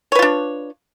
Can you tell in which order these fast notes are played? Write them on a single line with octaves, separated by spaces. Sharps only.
C#5 B4 F4 D4